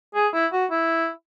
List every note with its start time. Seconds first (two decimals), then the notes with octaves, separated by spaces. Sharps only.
0.15 G#4
0.34 E4
0.52 F#4
0.71 E4